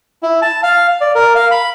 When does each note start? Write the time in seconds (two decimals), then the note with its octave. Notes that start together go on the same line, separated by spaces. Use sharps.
0.23 E4
0.42 A5
0.63 F5
1.01 D5
1.15 A#4
1.35 F5
1.51 B5